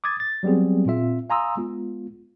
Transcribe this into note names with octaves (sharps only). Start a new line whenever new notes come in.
D6 D#6 G#6 A6
A6
F#3 G3 B3 C4 G#4
A#2 C4 F4 E5
F5 G#5 A#5 C6 D#6 E6
G#3 B3 F4